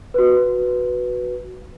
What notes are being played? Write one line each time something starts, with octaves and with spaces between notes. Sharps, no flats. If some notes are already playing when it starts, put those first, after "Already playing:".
F#4 B4